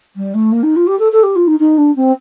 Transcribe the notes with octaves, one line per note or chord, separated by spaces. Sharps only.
G3
A3
A#3
D#4
F4
G4
A4
A4
G4
F4
D#4
D#4
D4
C4